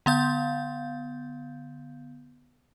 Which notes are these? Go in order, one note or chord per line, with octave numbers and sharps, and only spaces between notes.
D3 B3 F5 G6